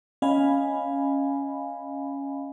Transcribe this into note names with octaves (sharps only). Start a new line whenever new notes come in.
C#4 D#5 F5 G#5 B5